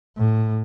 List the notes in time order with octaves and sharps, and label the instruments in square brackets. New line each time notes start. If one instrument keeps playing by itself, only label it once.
[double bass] A2